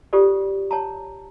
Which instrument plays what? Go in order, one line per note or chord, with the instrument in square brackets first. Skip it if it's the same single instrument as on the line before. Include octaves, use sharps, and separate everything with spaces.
[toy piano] F4 G4 A4 C5 D5
C#5 A5 A#5